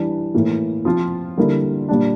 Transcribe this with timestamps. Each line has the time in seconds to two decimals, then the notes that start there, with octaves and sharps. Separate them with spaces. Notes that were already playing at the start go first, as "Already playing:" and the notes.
Already playing: E3 G3 D4
0.34 A2 E3 A#3
0.85 F3 C4 F4
1.37 D3 G3 A#3 E4 A#4
1.89 A#2 G3 D4